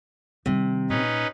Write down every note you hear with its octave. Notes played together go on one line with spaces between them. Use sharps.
C3 D#3 G3
A#2 C#4 D#4 B4